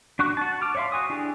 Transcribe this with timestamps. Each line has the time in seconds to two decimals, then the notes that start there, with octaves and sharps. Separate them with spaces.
0.19 D4 F#4 C#6 F#6
0.37 F#4 A5
0.62 D6 F6
0.75 C#5 D5 E5 F5 C6
0.92 F#4 G#5 D#6
1.10 D4 E4 G4 G#4 D5